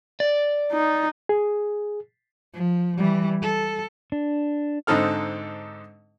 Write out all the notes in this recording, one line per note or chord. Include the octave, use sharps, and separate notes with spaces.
D5
D#4
G#4
F3
E3 G3
A4
D4
G#2 D3 C4 D#4 A4 F6